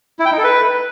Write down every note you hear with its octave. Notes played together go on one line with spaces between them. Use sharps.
E4
G5
D#4
A4
B4